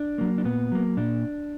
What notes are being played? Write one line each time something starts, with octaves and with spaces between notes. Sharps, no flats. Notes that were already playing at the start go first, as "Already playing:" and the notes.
Already playing: D4
F#3 A#3
D4
A#2 B3
F#3 A#3
A#2 D4